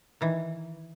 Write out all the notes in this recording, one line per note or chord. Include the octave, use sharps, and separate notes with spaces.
D#3 E3